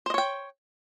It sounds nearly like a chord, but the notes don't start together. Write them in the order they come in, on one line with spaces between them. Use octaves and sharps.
C5 D#5 C#5 G5